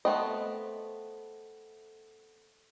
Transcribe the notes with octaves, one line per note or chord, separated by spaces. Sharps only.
A3 B3 C4 D#5